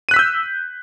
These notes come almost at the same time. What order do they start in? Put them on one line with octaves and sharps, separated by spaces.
D#7 F#6 B6 E6 G6